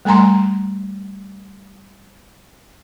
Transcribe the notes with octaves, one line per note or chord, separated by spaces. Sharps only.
G3 A3 G#5 A#5 C6